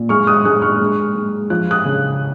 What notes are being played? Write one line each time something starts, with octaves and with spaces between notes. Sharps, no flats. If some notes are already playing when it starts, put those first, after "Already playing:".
Already playing: A#2
G#3 C#6 F6
D#6 F#6
G#3 D#6 F#6
C#6 F6
G#3
G#3
F3 F#6
D#6 F#6
C#3